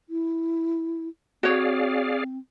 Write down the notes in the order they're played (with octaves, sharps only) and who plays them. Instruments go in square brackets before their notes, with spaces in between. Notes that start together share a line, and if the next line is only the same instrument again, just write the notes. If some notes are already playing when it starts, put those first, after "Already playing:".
[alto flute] E4
[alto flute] C4 [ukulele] F#4 C#5 [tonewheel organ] G#4 D5 F5